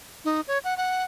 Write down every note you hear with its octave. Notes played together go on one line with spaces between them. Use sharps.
D#4
C#5
F#5
F#5